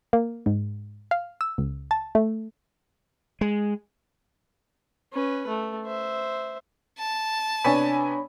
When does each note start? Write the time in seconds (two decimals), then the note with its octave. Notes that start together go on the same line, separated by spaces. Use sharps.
0.13 A#3
0.46 G#2
1.11 F5
1.41 E6
1.58 C#2
1.91 A5
2.15 A3
3.41 G#3
5.13 C#4 B4
5.48 A3
5.86 C5 E5
6.98 A5
7.64 C3 B3 D4 C#5 G#5 B5